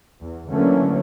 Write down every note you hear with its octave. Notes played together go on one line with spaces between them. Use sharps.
E2
D3 E3 F#3 A3 A#3 C#4